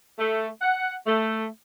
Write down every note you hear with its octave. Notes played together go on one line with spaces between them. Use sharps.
A3
F#5
A3